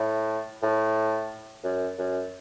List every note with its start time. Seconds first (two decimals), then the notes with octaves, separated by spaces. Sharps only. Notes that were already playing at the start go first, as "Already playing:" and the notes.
Already playing: A2
0.63 A2
1.64 F#2
1.98 F#2